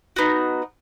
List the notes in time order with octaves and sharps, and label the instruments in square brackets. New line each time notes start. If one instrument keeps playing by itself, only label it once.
[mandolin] B3 D#4 F#4